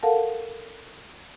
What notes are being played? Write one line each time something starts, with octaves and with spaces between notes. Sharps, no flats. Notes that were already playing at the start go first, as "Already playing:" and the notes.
A4 A#4 F5 F#5 A5